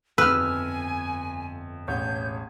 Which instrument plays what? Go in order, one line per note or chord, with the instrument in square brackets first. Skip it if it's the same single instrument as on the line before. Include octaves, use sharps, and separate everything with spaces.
[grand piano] G1 F2 [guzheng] B4 [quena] G#5 [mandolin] E6 F6
[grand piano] E1 A1 C#5 [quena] G6